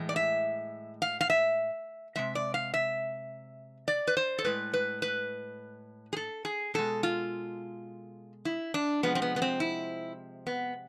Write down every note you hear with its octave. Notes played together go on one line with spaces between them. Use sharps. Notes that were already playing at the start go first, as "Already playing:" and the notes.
Already playing: A2 E3 G#3
D5
E5
F5
F5
E5
C3 G#3 E5
D5
F5
E5
D5
B4
C5
A4
A2 G#3 B4
B4
B4
G#4
A4
G#4
B2 G#3 A4
F4
E4
D4
C3 F3 G#3 B3
C4
B3
B3
C4
E4
B3